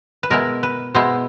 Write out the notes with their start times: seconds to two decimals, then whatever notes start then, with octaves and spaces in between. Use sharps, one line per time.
0.23 B4
0.30 B2 G#3 B3 E4 A#4
0.63 B4
0.94 B2 G#3 B3 E4 C5